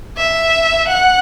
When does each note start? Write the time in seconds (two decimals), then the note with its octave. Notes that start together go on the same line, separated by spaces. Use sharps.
0.18 E5
0.88 F#5